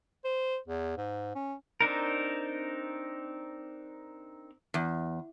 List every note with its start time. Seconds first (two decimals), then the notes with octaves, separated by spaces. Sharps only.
0.24 C5
0.68 E2
0.97 G#2
1.35 C#4
1.81 C4 D4 D#4 A#4
4.74 E2